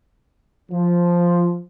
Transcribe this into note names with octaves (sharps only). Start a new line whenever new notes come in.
F3